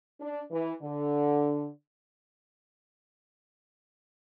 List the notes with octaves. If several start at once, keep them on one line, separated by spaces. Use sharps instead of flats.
D4
E3
D3